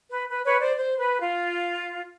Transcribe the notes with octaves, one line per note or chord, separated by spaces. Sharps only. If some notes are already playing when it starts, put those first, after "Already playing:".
B4
B4
B4 C#5
C5 D5
C5
B4
F4